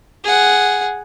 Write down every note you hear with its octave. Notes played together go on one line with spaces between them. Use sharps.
G#4 F#5